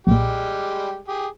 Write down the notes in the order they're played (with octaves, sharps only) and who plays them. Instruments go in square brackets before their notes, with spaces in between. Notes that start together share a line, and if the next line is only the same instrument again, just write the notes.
[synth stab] B1 A#2 [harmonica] G3 G#3 G4
[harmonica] G4 G#4